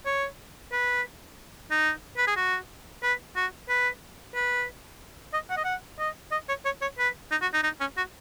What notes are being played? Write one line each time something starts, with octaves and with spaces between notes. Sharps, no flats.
C#5
B4
D#4
B4
G#4
F#4
B4
F#4
B4
B4
D#5
F#5
D#5
F#5
D#5
D#5
C#5
C#5
C#5
B4
D#4
F#4
D#4
D#4
C#4
F#4